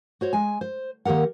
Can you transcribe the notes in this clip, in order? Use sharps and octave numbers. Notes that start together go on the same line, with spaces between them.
F#4 C5 C#5
G#3 G#5
C5
D#3 A#3 G4 A#4 F#5